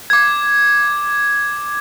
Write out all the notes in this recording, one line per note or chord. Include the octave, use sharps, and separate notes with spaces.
D6 G#6